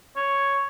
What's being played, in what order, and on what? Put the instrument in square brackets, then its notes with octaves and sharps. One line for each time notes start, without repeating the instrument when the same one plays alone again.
[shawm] C#5